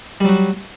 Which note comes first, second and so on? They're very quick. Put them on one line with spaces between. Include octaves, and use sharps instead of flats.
G3 F#3 F#4